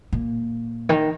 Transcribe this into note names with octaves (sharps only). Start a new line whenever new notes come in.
A#2
D#3